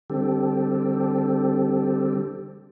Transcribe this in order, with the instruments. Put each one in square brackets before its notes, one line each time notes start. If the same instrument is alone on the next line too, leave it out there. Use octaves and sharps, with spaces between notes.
[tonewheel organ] D3 G3 C4 G4 A4